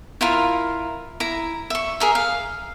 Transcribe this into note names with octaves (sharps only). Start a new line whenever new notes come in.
E4 F4 A#4
E4 A#5
E5 C#6
G#4 A#4 E5
F5